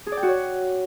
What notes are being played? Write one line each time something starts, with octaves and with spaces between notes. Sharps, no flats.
G#4
D5
G5
F#4
C#5